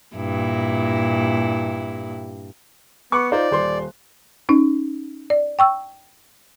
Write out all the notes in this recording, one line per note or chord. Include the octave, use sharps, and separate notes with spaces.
G2 A#2 E4
B3 C#6 D6 F#6
D#4 F4 C5 D5
D#1 C5 C6
C#4 D#4
D5
G5 C#6 E6